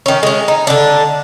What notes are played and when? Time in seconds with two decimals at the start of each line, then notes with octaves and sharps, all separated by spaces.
0.06 D#3 C#4
0.23 G#3 C#4
0.48 D#4
0.67 D3 D4